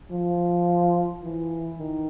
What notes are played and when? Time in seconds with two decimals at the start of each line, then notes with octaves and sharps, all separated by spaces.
0.11 F3
1.23 E3
1.79 D#3